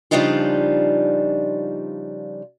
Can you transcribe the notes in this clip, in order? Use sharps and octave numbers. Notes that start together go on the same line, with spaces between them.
C#3 F3 G3 D4 D#4 F4